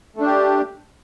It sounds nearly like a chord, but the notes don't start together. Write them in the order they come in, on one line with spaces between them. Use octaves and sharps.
A3 D4 G4